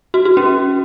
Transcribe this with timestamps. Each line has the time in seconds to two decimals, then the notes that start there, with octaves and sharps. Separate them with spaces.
0.14 F#4
0.25 F#4
0.37 C#4